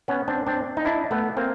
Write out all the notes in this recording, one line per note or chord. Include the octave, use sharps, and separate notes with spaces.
B3 C#4
C4 D4
C4 D4
D#4
D4 E4
A3 B3
A#3 C4